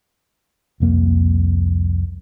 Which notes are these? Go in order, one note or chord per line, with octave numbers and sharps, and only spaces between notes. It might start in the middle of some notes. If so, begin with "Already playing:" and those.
C2 F2 A#3